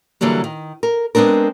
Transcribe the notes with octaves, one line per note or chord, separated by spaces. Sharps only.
D3 E3 F#3 G3 A#3
D#3
A#4
G#3 B3 C4 D4 A#4